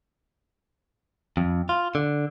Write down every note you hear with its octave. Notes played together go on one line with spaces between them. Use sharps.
F2
F4
D3